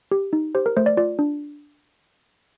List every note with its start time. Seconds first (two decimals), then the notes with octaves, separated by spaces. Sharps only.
0.12 G4
0.33 D#4
0.55 G4 C5
0.66 A#4
0.77 A3 C5
0.86 D5
0.97 F4 D5
1.19 D4